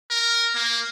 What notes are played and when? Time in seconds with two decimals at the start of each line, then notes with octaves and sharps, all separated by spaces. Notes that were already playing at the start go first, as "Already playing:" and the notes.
0.11 A#4
0.55 A#3